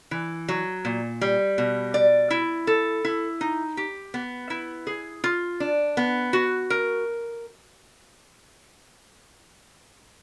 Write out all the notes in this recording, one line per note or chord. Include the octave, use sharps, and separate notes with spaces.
E3
F#3
A#2
G3
B2
D5
E4
A4
E4
D#4
G4
B3
E4
G#4
F4
D4
B3
F#4
A#4